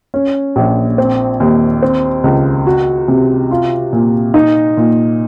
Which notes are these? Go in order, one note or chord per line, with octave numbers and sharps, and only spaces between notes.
C#4
A#1
C4
D#2
C4
C#2
F#4
C3
F4
A#2
D#4
A#2